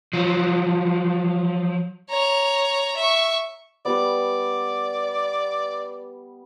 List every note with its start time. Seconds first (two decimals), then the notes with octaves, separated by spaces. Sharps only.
0.13 F3 F#3
2.10 C#5 A#5
2.97 E5 C#6
3.85 G3 B3 D5